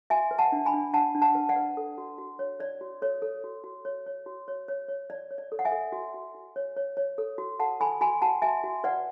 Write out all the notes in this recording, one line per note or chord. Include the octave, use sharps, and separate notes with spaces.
F#4 E5 G#5
B4
F#5 A5
D4
G#5 B5
D4
D4 F#5 A5
D4
F#5 A5
B4
D5 F#5
B4
A4
F#4
F#4
C#5
C#5 D5
F#4
A4 C#5
A4
F#4
F#4
C#5
C#5
F#4
C#5
C#5
C#5
C#5 D5
C#5
D5
A4
F#5
E5 G#5
A4
F#4
F#4
F#4
C#5
C#5
C#5
A4
F#4
A4 F#5 A5
A4 G#5 B5
F#4 G#5 B5
F#4 F#5 A5
F#4 E5 G#5
F#4
B4 D5 F#5